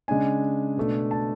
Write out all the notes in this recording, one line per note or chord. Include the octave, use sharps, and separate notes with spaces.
C#3 G#3 D4 G#5
B2 A3 D4
A5